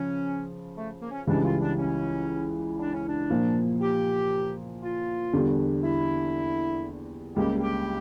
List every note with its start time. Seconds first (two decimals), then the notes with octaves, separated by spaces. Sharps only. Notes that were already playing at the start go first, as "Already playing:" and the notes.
Already playing: C#3 F3 C#4
0.76 A3
1.01 A#3
1.10 C#4
1.27 C#2 C#3 E3 G3 D4
1.44 F4
1.61 D4
1.78 C#4
2.80 D4
2.93 C#4
3.08 D4
3.30 A#2 F3 A#3
3.81 G4
4.82 F4
5.33 E2 D3 G3 D4
5.84 E4
7.36 C#2 C#3 G3 A#3 G4
7.61 G4